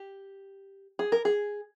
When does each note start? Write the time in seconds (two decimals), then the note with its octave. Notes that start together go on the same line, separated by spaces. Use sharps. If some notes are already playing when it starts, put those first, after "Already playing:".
Already playing: G4
0.99 G#4
1.12 A#4
1.25 G#4